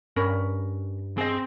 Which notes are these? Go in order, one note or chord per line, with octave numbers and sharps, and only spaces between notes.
G2 C#4 A#4 B5
C4 G#4 D#5